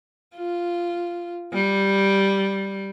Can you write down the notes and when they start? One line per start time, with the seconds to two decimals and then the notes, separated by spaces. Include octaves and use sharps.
0.36 F4
1.53 G3